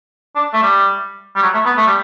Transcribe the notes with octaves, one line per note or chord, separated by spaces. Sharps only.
D4
A3
G3
G3
F#3
A3
B3
A3
G3